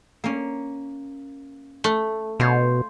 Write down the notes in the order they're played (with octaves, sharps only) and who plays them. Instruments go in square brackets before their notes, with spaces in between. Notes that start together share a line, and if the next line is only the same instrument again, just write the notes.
[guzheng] A#3 C#4
[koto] A3
[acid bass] B2 [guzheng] F4 C5 C#5